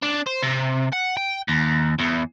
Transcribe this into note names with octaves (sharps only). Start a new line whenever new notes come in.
D4
C5
C3
F#5
G5
D#2
E2